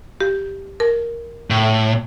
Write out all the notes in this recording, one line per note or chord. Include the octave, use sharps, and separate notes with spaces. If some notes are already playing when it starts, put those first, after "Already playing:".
G4
A#4
A2